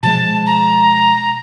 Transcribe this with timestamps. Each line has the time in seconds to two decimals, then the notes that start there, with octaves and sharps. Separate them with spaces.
0.03 B2 F3 G#3 A5
0.46 A#5